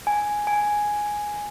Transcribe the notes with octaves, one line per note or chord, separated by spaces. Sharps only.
G#5
G#5